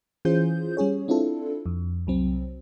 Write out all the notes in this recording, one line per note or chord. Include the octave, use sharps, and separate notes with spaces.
E3 C#4 F4 G#4 C5 G6
G3 C#4 G#4 C#5
C4 D4 E4 F4 A4
F2
C2 F#3 C4